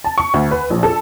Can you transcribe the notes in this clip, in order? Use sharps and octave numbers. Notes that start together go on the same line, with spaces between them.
A5
C#6
D2
B4
A#1
A4